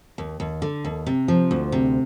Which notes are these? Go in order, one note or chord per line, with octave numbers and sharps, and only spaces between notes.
D#2
D#2
D3
D#2
C3
F3
D2
C3